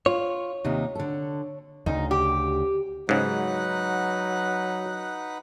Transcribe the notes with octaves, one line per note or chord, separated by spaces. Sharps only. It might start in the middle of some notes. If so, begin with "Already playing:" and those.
F4 C#5
D#2 C3 D#4
D3 A4
D2 C#3 D#4
G4
G#2 C#3 F#3 D#4 B4 F#5